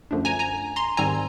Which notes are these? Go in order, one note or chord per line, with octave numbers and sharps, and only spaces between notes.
F#2 D3 F3 A3 D4
G#5 A#5
G#5 A#5
A#5 C6
G#2 D#3 G3 C4 G#5 A#5